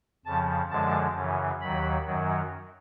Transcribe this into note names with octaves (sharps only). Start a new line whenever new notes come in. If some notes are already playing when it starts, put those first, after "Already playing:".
F2 C#3 F3 A5
F#2 D3 F3 G#3 A5
F#2 C#3 E3
D#2 D#3 F#3 B5
F#2 D#3 F#3